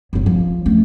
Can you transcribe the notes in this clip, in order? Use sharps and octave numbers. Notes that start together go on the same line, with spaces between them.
F#1 D#2
F3
A3 C#4